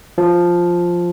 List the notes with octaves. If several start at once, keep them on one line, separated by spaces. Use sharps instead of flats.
F3